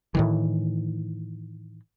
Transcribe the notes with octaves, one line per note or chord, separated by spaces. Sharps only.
A2 D#3 E3